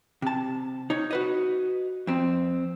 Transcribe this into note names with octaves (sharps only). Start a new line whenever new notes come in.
C3 A5
D#4 C#5
F#4 B4 D#5
F2 C4